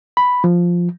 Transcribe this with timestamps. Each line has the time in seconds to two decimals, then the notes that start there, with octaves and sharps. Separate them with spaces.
0.17 B5
0.44 F3